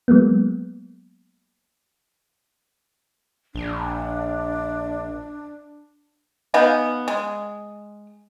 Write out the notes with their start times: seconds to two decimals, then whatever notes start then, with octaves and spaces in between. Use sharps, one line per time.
0.08 F#3 G#3 A#3 B3
3.55 A#1 D4
6.54 B3 D#4 F5 G#5
7.08 G#3